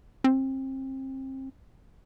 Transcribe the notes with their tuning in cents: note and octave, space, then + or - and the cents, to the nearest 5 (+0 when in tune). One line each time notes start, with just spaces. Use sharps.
C4 +30